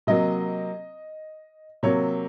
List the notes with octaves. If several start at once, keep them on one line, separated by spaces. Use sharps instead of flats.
C3 F#3 A#3 D#5
C3 F#3 A#3 C#5